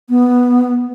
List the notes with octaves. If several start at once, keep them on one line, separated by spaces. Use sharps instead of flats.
B3